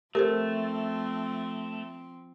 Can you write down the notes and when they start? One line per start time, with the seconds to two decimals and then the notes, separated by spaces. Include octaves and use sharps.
0.15 F3 A3 C4 G4 A4 A#4 C5